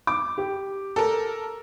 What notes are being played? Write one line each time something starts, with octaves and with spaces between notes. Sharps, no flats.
D6
G4
A4 A#4